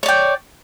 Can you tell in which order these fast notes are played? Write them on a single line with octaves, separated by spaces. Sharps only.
C#5 D5 G5